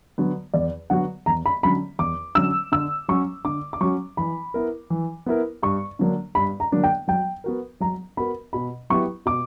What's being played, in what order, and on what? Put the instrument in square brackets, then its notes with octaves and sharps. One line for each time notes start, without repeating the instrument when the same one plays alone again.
[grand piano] D3 F#3 B3 F#4
[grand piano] E2 [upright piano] D5
[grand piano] D3 F#3 B3 F#4 [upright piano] F#5
[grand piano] E2 [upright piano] A#5
[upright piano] B5
[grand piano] D3 F#3 C#4 [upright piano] B5
[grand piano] E2 [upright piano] D6
[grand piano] D3 F#3 C#4 [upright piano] E6
[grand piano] D3 [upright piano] E6
[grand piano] F#3 C#4 F#4 [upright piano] C#6
[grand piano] D3 [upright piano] D6
[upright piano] D6
[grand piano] F#3 C#4 F#4 [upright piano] C#6
[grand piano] E3 [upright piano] B5
[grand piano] B3 E4 A#4
E3
B3 E4 A#4
[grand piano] G2 [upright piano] C#6
[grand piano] D3 F#3 A#3 D4
[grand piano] G2 [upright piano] B5
[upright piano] A#5
[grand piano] D3 F#3 A#3 D4
[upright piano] G5
[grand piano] F#3 [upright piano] G5
[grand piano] B3 F#4 A#4
[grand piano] F#3 [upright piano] A#5
[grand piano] B3 F#4 A#4 [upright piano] B5
[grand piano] B2 [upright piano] B5
[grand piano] F#3 B3 E4 G4 [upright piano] C#6
[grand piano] B2 [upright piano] D6